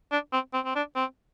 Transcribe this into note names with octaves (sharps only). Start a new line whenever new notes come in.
D4
C4
C4
C4
D4
C4